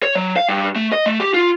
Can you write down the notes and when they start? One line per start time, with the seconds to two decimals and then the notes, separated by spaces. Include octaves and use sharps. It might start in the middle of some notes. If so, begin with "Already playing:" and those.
0.03 C#5
0.15 F#3
0.36 F5
0.49 G2
0.76 A3
0.92 D#5
1.06 A3
1.20 G4
1.34 F4